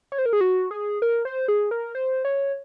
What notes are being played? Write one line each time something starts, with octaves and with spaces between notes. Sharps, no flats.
C#5
C5
A#4
G#4
F#4
G#4
A#4
C5
G#4
A#4
C5
C#5